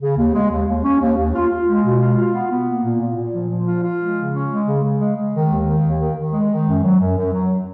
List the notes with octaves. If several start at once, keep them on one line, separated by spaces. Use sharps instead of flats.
C#3
D#2
G#3
D#2
D#2
C#4
D#2
D#2
F4
F4
G#3
B2
F4
F4
B3
B3
A#3
A#2
A#2
A#2
F3
F3
F4
F4
G#3
C#3
C#4
G#3
C#3
C#3
G#3
G#3
D#3
D#2
D#3
D#2
D#3
D#3
G#3
D#3
F#2
F#3
F#2
F#2
F#3